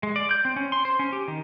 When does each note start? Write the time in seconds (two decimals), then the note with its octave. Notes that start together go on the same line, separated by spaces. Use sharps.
0.03 G#3
0.16 D5
0.31 G6
0.45 C4
0.56 C#4
0.72 C6
0.85 C5
0.99 C#4
1.13 G4
1.28 D#3